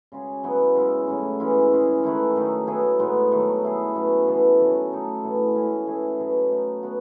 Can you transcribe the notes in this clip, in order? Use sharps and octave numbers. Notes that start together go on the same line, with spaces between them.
C#3 G#3 C#4 F#4
F#3 B3 E4
C#3 G#3 C#4 E4
A2 F#3 C#4
E3 G#3 C#4 E4
G#3 C#4 G#4
D#3 A3 E4 B4
D#3 F#3 A3 D#4
F#3 B3 E4 G#4
A2 G#3 B3 D#4
D#3 F#3 A3
A3 E4 G#4
B2 F#3 C#4 F#4
E3 B3 F#4 A4
D#3 F#3 C#4
A3 D#4 A4
A2 E3 B3
G#3 C#4 E4 A4
E3 A3 E4 G#4
B2 F#3 B3
A3 D#4 F#4
B3 F#4